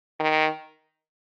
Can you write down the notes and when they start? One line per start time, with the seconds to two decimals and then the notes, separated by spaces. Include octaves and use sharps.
0.20 D#3